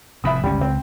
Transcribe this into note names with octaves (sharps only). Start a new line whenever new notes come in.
F1 F2 A2 E5 B5 D#6
G1 C#2 G3 C#4
C#2 C4